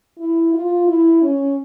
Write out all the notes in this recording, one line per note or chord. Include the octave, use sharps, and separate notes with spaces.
E4
F4
E4
C#4